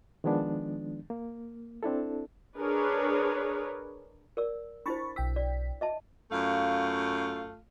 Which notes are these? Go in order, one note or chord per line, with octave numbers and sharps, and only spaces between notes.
D#3 F3 G#3 B3 D4
A#3
C4 D4 E4 A4
D4 G#4 A#4 B4 C#5
A#4 D5 E6
D4 E4 C5 B5 C#6 A6
B1 G5 E6 B6
D5
D#5 E5 A5
F#2 A3 F4 F5